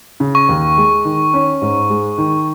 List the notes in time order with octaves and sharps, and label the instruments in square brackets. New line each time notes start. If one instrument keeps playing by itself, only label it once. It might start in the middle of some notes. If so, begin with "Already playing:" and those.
[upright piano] C#3
[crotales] C#6
[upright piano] D#2
G#3
D#3
C#4
G#2
G#3
D#3